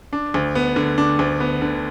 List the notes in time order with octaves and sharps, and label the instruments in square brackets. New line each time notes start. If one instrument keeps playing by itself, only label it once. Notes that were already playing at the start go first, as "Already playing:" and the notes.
[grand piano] D4
D2
B3
D3
D4
D2
B3
D3